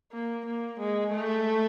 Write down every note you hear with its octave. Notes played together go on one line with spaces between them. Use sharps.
A#3
A#3
G#3
A3